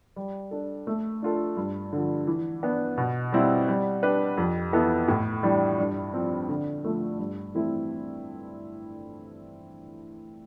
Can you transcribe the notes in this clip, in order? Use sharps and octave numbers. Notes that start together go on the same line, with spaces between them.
G3
D4 A4
A3
D4 F4 A4
G2
D3 F3
E3
B3 D4
B2
G3 C4 E4
G3
D4 G4 B4
F2
E3 B3 E4 A4
A2
E3 G3 D4
G2
F3 C4
D3
F3 A3
G2
E3 A3 C4 E4